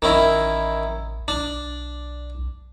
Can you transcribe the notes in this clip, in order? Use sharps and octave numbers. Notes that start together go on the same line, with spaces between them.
A1 D#3 C#4 E4
B1 D4